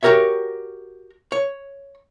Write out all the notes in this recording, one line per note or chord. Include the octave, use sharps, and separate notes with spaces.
F#4 G4 A#4 C#5 E5
C#5